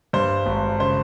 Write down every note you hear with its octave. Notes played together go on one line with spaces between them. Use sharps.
G2 C5
G#1
C#3 C5